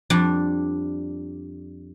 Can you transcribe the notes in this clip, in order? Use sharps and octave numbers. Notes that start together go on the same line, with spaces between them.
F2 G3 D4